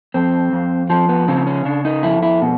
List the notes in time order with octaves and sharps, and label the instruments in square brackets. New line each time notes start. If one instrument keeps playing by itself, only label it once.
[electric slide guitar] F2 C4
F2
F3 C4
B3
C#3 C4
C#4
C#3 D4
D#4
F2 E4
E4
B2